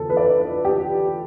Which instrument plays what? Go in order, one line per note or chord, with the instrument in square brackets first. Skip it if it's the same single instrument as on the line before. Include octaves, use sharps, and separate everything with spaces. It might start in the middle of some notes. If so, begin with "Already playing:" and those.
Already playing: [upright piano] E2 D3 A4
B4
D5
B4
G4